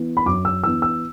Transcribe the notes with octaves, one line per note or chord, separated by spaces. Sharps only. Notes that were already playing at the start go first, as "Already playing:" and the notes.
Already playing: E3 B3
B5
F#2 D6
E6
E3 B3 E6
E6